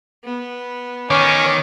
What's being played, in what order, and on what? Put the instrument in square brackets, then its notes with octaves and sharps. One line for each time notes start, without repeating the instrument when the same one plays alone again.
[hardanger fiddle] B3
[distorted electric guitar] D#3 [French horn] C#4 [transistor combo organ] C#5 D6